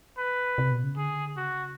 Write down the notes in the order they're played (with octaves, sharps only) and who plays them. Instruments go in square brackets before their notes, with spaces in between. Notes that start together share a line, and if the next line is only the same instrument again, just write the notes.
[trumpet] B4
[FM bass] C3
B2
C#3
[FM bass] D3 [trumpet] G#4
[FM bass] C#3 [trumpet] F#4